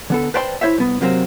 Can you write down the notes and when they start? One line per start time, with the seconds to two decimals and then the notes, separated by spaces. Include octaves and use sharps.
0.10 D3 B3 A4
0.34 B4 C5 D5 G5 A5 C6
0.61 E4 C5 C#5 E5
0.78 C2 B3
1.01 C3 F#3 A#3 C4